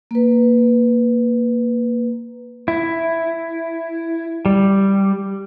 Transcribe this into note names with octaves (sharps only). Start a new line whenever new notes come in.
A#3 B4
E4
G3